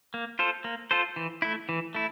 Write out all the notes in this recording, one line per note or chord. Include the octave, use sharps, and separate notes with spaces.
A#3
F4 A4 C5
A#3
F4 A4 C5
E3
A3 E4
E3
A3 E4